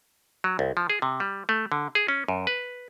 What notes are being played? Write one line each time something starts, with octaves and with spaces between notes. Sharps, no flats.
F#3
C2
F3
G#4
C3
G3
A3
D3
G#4
C#4
F#2
B4